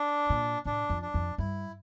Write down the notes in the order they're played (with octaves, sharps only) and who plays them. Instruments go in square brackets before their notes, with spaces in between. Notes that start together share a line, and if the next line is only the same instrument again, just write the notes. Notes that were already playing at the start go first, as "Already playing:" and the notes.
Already playing: [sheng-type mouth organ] D4
[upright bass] A#2
[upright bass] A2 [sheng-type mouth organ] D4
[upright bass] F2
[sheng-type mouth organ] D4
[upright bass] F2
[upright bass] G2 [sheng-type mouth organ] E4